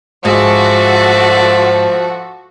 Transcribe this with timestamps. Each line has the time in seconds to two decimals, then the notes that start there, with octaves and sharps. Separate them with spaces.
0.25 G#2 F3 F#4 A4 D5 E5